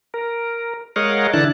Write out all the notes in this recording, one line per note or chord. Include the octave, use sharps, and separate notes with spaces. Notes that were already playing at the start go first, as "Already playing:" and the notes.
A#4
G#3 A#4 C#5 D#5 F5 F#5
D3 E3 D4 E4 A5 F#6